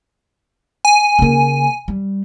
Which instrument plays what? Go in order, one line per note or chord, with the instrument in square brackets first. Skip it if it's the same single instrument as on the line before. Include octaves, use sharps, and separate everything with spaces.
[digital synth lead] G#5
[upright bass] C#3 A#3
G3